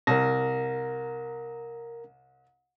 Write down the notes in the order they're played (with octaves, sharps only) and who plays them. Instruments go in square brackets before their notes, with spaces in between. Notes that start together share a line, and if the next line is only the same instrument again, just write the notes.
[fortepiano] C2 [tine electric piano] A#4 A#6